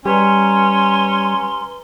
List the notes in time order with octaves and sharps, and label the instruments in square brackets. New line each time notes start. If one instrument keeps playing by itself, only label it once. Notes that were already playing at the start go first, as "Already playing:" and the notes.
[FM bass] G3 [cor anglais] C#4 [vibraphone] G4 B4 A#5 [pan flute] C6